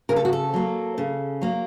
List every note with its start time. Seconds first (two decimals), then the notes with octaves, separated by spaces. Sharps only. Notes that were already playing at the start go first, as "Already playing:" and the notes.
0.09 C#3 A#4
0.16 A4
0.25 F#4
0.33 A4
0.54 F#3 A#3
0.98 C#3
1.41 F#3 A#3